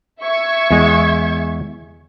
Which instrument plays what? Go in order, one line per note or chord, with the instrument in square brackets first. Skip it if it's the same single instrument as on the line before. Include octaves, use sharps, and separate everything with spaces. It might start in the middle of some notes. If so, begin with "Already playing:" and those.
[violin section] E5 C#6 G#6
[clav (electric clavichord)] E2 G#3